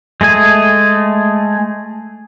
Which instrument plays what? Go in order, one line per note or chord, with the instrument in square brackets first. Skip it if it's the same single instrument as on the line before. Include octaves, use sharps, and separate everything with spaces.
[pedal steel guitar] G#3 A3 G#4 G#5